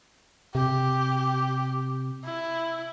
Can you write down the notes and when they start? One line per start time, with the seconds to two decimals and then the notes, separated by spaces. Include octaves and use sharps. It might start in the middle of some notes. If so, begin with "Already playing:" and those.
0.55 C3 G4
2.25 E4